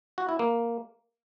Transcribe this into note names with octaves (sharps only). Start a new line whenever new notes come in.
F#4
E4
A#3